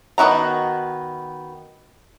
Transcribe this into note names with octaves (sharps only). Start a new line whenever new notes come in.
D#3 B3 E4 F#4 A#5